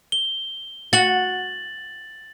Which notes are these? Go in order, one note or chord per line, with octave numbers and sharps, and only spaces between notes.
G7
F#4 A6 F#7